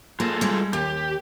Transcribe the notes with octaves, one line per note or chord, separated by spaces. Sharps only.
A#3 F4 G#4 A4
G3 G#3
D#2 G4